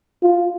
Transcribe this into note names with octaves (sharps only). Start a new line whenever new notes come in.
F4